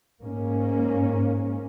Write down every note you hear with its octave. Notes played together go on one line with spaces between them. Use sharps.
G#2 A#3 C#4